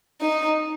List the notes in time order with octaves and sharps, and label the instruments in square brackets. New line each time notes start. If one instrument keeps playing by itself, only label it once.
[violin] D#4